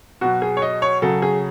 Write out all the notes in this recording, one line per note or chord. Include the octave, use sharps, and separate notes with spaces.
B2 F#3 F#4
G#4
C#5
D#5
C#5
C#3 F#3 A4
G#4